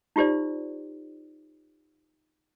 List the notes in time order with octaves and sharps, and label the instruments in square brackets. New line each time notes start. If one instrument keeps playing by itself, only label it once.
[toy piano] D#4 F4 G4 C5 D5